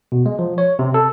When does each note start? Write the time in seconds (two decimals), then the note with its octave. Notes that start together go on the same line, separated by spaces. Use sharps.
0.12 B2
0.26 G#3
0.39 F3
0.58 C#5
0.79 C3
0.94 A4